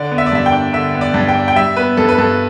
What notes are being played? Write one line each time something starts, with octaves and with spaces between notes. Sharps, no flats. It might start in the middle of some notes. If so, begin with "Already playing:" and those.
Already playing: D3 D5
B3
E5
D5
G2 E5
G5
D4
D3 E5
B3
D5
G2
G5
D4
G5
G3 E5
B3 B4
G2 A4
B4
G2 A4